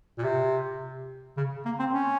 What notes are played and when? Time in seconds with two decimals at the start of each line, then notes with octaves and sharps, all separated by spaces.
0.18 A#2
0.24 C3
1.37 C#3
1.65 A#3
1.79 C4
1.93 C#4